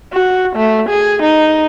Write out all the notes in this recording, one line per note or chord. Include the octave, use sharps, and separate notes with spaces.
F#4
A3
G#4
D#4